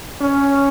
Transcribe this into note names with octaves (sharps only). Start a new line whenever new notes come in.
C#4